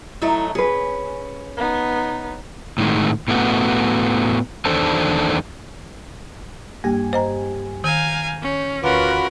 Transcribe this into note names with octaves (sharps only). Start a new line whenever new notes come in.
F#3 A3 D#4 E4
C#4 G#4 B4
B3 D#4
A2 D#3 G#3
A2 A3 B3 F#4
E2 D#3 D4 A4 C5 A5
G2 A#3 G4 G#5
C5 D#5 A#5
D#3 F5 G#5 A#5 G6
C#4
D2 C#4 F4 F#4 A#4 B4 B5 D6